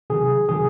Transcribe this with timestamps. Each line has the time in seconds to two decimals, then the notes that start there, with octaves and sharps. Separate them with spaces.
0.10 C3 D#3 F#3 G#4
0.49 C3 D#3 F#3 G#4